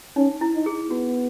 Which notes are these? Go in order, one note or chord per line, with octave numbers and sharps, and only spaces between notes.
C#4 D#4
E4
D#4
G#4
B3 F#4